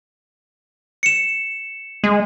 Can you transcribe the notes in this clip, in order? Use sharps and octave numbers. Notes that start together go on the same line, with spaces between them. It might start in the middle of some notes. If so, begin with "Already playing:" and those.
C#7 E7
G#3